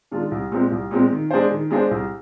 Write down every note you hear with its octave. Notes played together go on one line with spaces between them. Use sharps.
D#3 G#3 D4 F4
C2
A#2 G#3 C4
C2
A#2 G#3 C4
D#3
G#3 D4 G#4 C5
D#3
G#3 D4 G#4 C5
C2